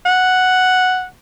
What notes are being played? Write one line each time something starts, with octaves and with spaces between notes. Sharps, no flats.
F#5